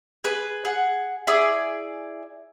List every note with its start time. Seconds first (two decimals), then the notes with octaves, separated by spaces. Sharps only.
0.24 G#4 B4
0.65 G#4 F#5
1.27 E4 G#4 D5 D#6